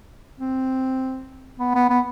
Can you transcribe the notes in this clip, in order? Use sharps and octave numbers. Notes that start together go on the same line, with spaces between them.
C4
B3
B3
B3